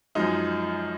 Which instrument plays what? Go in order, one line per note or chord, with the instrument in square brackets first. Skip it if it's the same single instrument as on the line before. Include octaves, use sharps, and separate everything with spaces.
[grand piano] F#2 F3 G#3 D#4